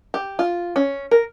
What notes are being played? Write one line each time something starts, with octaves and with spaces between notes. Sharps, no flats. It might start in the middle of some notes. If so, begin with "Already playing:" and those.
G4
F4
C#4
A#4